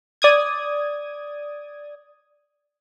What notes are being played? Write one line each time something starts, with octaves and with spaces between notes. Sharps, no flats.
D5 D#6 G#6